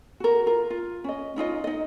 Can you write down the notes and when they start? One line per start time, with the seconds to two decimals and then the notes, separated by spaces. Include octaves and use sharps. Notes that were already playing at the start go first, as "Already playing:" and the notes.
0.20 F#4 A#4
0.46 F4 A#4
0.70 F4
1.04 C#4 D#5
1.36 C#4 D#4 F4 D#5
1.64 D#4 D#5